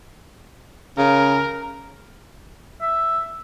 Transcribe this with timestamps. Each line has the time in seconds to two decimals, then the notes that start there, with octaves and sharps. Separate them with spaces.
0.98 C#3 A#4
2.81 E5